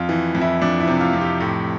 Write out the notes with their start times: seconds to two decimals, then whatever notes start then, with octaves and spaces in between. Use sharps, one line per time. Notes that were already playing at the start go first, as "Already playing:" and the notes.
Already playing: F2 F4
0.09 E3
0.35 F2
0.41 E4
0.62 F2 D4
0.80 E4
0.88 C3
1.01 F4
1.13 F2
1.21 G4
1.40 A2